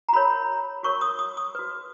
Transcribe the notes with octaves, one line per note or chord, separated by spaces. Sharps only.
A#5
F#4 A#4 C#5 B5
F#4 A#4 C#5 C#6
D#6
D#6
D#6
F#4 B4